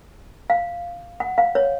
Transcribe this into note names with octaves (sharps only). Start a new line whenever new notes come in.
F5
F#5
F5
C#5